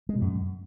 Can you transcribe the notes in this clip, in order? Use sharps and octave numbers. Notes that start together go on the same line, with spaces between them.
G#3
B2
F#2